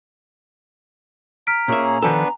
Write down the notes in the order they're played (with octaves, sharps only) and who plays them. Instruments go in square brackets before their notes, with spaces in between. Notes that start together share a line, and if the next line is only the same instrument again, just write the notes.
[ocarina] A#5 [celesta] F6 B6 D7
[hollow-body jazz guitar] A#2 E5 [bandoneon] A#3 C#4 G#4
[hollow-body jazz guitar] D#3 F3 A4 [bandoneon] B3 D4 B4 [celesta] G#5